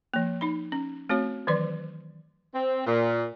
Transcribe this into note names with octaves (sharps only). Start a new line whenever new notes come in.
F3 A#3
D#4 B5
C#4
A3 C4 F#4 C#5
D#3 E3 F#3 B4 D5
C4
A#2